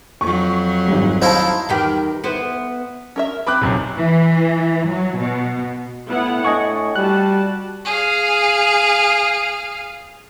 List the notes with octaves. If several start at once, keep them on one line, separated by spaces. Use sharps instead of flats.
F2 F#3 C#6
G#1 G3
D#4 E4 C5 F5 A5
E2 D#3 G4
B3 E4 C5
C#4 A#4 E5
C4 G4 B4 B5 D6 F#6
B1 F#2 C3
E3
F#3
B2
A2 B3 E4 F#5
A3 D4 D#5 G#5 C#6
G3 F#4 A5 F#6
G#4 F5